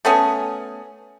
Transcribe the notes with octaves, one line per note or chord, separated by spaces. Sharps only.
A3 B3 C#4 G#4